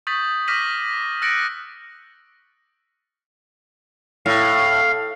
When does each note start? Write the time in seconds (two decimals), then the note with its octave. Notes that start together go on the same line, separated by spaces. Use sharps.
0.07 C#6 D#6 G6 A6 B6 F#7
0.48 D6 F6 A#6 B6 D#7 F#7
1.22 E6 F#6 A6 A#6 C#7 D7
4.26 A2 F5